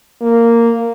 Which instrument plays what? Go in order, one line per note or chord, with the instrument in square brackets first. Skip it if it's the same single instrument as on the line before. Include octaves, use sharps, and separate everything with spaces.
[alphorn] A#3